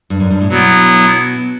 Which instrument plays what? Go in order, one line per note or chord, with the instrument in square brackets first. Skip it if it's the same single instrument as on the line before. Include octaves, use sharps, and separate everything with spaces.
[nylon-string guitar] G2
F#2
G2
A2
[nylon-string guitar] B2 [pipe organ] F#3 B3 E4